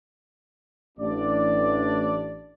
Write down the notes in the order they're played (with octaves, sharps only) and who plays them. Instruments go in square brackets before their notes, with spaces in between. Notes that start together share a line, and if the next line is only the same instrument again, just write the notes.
[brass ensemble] A1 D4 D5